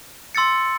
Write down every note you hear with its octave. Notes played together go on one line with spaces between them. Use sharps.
C6 E6 A6 C#7